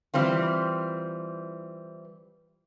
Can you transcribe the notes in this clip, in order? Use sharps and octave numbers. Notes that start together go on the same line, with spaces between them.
E3 G3 C4 F4